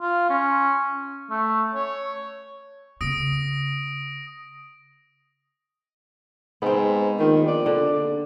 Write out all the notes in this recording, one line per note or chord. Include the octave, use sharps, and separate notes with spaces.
F4
C#4
A3
C#5
C#3 B3 D#6 A#6 D7
G#2 B3 C4
A#1 D#3
D5
D3